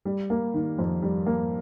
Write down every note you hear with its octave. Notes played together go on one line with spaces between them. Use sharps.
G3
A#3
D#3
F2
G3
A#3